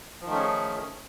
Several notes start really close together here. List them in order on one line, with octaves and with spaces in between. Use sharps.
F3 D#3 A3 C#4 G#4